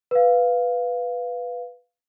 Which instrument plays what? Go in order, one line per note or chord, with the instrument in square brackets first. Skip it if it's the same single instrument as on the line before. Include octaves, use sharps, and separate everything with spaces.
[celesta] B4 F5